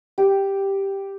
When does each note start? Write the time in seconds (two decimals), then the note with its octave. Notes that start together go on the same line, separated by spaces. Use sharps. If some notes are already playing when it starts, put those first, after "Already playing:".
0.18 G4